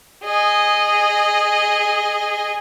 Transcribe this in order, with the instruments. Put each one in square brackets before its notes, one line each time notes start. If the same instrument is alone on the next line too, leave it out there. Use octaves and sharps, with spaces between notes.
[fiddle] G#4 D#5